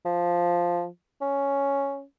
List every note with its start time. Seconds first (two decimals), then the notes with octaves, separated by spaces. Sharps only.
0.05 F3
1.21 C#4